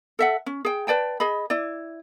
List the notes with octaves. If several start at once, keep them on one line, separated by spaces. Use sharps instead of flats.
A4 E5 F#5
C#4
G#4 G5
B4 D5 G5 A5
G#4 D#5 B5
E4 D5